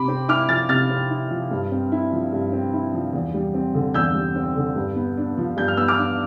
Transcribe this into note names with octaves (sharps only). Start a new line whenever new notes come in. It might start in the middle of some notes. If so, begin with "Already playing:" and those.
Already playing: C3 B5 D6
C4
E4 D6 F6
F3 F6 A6
C3 F6 A6
C4
E4
F3
G2
C4
E4
F3
G2
C4
E4
F3
E2
G3
C4
D3
E2 E6 G6
G3
C4
D3
G2
B3
D4
F3
G2 G6
F6
B3 E6
D6 F6
D4